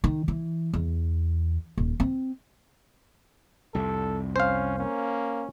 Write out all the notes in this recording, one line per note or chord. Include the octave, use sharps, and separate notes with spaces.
D#3
E3
E2
D#1
C4
C2 F2 C3 A4
C#4 C5 F5
A#3 C#4